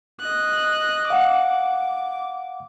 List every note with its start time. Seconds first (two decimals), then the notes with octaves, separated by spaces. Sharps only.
0.20 D#5 F#6
1.10 F5 F#5 D6